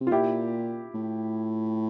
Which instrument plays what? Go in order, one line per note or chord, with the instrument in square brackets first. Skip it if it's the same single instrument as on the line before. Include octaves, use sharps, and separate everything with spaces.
[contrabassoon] C3
[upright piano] F4
[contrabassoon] A#2 [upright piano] E4 G4
[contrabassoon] A2